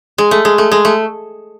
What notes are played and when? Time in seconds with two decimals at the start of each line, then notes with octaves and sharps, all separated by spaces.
0.18 G#3
0.31 A3
0.45 G#3
0.58 A3
0.71 G#3
0.85 A3